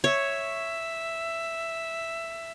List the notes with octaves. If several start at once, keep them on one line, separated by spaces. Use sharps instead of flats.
C#5 E5